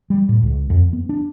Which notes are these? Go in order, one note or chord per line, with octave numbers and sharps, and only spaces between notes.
G3
A2
C#2
F2
B3
D4